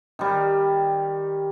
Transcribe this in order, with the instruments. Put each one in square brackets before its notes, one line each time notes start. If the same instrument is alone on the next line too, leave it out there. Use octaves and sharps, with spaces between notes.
[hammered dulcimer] D#3 G3